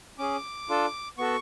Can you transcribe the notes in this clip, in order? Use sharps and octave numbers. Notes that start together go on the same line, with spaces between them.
C#4 G#4 D6
D4 F4 A4
B3 F#4 A4 C#6